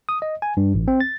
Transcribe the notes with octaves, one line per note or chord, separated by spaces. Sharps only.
D#6
D#5
G#5
G2
A1
C4
A6